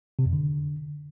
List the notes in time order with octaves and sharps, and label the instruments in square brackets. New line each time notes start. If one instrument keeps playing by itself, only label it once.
[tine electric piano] C3
F2
D3